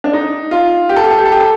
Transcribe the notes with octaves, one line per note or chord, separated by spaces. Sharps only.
D4
D#4
F4
G4
A4
G4
A4
G4
A4
G4
A4